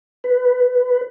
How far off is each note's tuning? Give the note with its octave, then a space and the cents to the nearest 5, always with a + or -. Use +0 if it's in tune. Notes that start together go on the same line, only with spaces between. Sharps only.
B4 +15